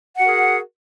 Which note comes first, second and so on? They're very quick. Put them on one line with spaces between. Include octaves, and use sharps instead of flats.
F#5 F#4 A#4 G#4